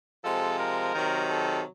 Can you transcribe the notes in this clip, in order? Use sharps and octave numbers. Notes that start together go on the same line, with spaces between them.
C3 F3 G#3 A4
A#4
C3 D#3 F#3
A4